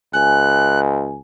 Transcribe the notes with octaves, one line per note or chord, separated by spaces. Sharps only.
C#2 G#5 F#6